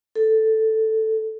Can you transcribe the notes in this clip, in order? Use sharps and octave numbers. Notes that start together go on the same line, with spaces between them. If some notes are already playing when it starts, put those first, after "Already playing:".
A4